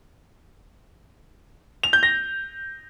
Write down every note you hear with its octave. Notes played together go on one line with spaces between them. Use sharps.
F7
G6
A#6